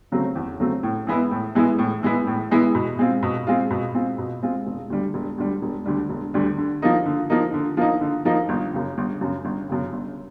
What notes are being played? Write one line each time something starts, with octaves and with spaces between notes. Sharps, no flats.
C#3 F#3 A3 C4
E2
C#3 F#3 A3 C4
A2
E3 G#3 B3 E4
A2
E3 G#3 B3 E4
A2
E3 G#3 B3 E4
A2
E3 G#3 B3 E4
B2
G#3 C4 F4
B2
G#3 C4 F4
B2
G#3 C4 F4
B2
G#3 C4 F4
E1
D2 D3 G3
E1
D2 D3 G3
E1
D2 D3 G3
E1
D2 D3 G3
D3
F3 A#3 D#4
D3
F3 A#3 D#4
D3
F3 A#3 D#4
D3
F3 A#3 D#4
G1
F#2 C#3
G1
F#2 C#3
G1
F#2 C#3
G1